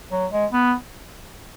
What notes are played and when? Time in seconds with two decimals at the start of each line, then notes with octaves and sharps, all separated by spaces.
0.12 F#3
0.31 G#3
0.53 B3